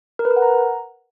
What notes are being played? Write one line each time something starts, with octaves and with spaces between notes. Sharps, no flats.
A#4
B4
A#4
F#5
A#5